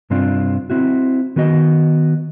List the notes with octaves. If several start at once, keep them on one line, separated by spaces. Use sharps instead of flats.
G2 C3 C4 D4 F4
C4 E4 F#4
D#3 B3 F#4 D#5